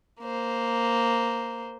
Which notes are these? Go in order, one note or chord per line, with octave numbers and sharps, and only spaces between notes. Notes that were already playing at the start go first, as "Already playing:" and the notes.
A#3 C5